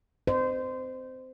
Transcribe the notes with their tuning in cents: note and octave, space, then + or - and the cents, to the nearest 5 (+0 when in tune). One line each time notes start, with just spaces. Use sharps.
C5 -20 D#5 -30